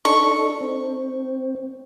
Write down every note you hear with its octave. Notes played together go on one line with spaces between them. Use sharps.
D4 D#4 A4 C#6
C4